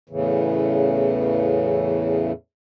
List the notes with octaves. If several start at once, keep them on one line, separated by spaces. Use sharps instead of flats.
E2 A2 C#3 E3